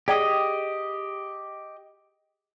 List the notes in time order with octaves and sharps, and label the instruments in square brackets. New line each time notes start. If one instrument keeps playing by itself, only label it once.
[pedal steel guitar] G4 D#5 [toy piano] G#4 D5 G5